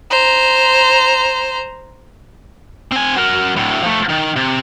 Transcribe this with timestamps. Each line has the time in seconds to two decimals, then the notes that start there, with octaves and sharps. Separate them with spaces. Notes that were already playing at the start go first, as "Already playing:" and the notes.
0.11 C5 A#5
2.92 C4 G#5
3.16 F#3 A#4
3.56 D2 A2
3.82 F3 A3
4.09 D#3
4.36 C3